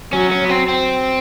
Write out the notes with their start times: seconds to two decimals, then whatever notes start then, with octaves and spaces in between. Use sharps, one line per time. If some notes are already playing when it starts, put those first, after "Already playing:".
0.13 F#3 C#4
0.31 C#4
0.45 B3
0.49 C4
0.68 C4